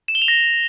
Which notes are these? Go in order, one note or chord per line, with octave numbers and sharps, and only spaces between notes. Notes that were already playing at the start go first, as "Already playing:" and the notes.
E7
G7
F7
A#6